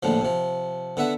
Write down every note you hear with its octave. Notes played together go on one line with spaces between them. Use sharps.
A#1 A2 D3 F3
C3 F3
D3 B3 E5 F#5